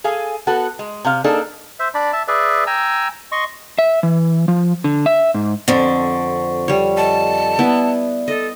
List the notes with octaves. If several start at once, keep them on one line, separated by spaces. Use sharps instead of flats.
G#4 A4 F5 G#5
B3 F#4 A4 F#5
G#3
C3 F5
A#3 D4 D#4 G#4 A4
C5 E5
D4 D5 B5
E5 A5
G#4 B4 D5 E5
G5 G#5 A#5 E6
D#5 C6 C#6
E5
E3
F3
D3
E5
G#2
F2 D3 C4 C5 C#6
G3 C#5
D#5 A5
B3 E4 D5
A4 D#5